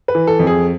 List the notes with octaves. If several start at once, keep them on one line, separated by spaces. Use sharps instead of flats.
B4
E3
A4
F2
G#4